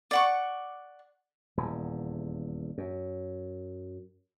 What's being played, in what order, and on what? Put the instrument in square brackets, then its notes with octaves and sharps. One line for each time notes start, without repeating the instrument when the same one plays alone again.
[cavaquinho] D5 F#5 C#6
[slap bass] D#1 E2
F#2